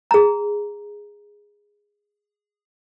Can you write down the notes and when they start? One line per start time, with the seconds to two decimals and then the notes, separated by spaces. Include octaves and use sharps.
0.11 G#4 A#5